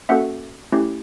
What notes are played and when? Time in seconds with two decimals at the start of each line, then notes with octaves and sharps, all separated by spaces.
0.09 A#3 C#4 F#4 A4 E5 F#5
0.72 A3 C#4 E4 G4